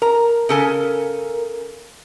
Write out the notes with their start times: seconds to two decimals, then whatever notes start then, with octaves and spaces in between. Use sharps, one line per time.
0.02 A#4 A#5
0.49 C#3 A4 G#5